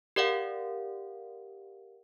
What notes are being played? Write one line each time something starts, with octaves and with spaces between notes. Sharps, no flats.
G4 A#4 D5 F5 F#5